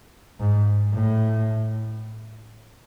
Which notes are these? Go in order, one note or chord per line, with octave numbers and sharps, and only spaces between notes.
G#2
A2